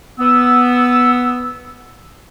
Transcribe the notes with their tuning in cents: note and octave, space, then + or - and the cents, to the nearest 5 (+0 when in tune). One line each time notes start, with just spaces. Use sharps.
B3 +0 E6 +0